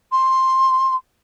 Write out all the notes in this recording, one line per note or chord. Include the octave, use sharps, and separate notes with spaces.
C6